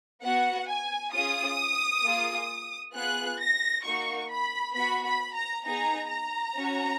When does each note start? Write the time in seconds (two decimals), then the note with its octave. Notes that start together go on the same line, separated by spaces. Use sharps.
0.22 B3 F#4 F#5
0.69 G#5
1.13 C#4 F4 G#4 D#6
2.03 A#3 F4 G#4
2.93 B3 F4 G#4 F#6
3.39 A#6
3.83 A#3 D#4 F#4 C#6
4.30 B5
4.74 B3 F#4 B5
5.04 B5
5.34 A#5
5.65 B3 D#4 G#4 A#5
6.09 A#5
6.55 C#4 F#4